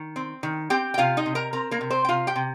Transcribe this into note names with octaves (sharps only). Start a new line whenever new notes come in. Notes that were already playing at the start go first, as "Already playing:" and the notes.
Already playing: D#3
C4
D#3
C4 G4 G5
G5
C3 F4 F5
D#4 D#5
C3
A#4 A#5
C4 A#4 A#5
A#3 A#4
C3
C4 C5
G5
C3 F4 F5
G4 G5
C3